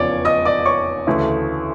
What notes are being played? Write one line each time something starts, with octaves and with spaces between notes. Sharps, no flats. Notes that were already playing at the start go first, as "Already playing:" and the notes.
Already playing: F1 E2 C#3 F3 C#5 D5 D6
D#5 D#6
D5 D6
C#5 C#6
D2 C#3 E3 A3